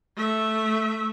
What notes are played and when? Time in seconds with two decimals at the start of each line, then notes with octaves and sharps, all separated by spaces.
0.17 A3 E5